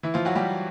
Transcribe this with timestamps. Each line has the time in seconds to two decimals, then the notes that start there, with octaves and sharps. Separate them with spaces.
0.03 E3 E4
0.14 F3 F4
0.25 F#3 F#4
0.35 G3 G4